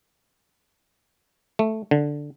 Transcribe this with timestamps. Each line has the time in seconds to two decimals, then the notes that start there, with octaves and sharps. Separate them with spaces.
1.59 A3
1.91 D3